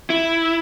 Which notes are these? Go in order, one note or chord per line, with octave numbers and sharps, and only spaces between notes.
E4